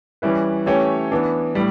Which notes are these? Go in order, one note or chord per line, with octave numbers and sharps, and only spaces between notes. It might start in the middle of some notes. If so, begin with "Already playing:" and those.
E3 G3 C#4 E4 B4
E3 A3 C#4 G4 C#5
E3 B3 D4
A2 G3